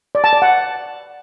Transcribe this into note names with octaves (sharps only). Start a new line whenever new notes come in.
D5
A5
D5
F#5